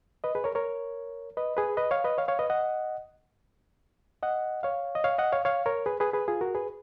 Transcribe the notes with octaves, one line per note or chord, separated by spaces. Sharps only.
B4 D#5
G#4 B4
A#4 C#5
A#4 C#5
B4 D#5
G#4 B4
B4 D#5
C#5 F5
B4 D#5
C#5 F5
C#5 F5
B4 D#5
D#5 F#5
D#5 F#5
C#5 F5
D#5
C#5 F5
D#5 F#5
C#5 F5
C#5 F5
A#4 C#5
G#4 B4
G#4 B4
G#4 B4
F4 G#4
F#4 A#4
G#4 B4